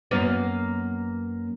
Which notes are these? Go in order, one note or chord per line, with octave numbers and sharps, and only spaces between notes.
F#2 A#3 B3